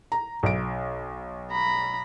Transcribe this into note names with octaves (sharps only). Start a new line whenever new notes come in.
A#5
B1 D7
A#5 B5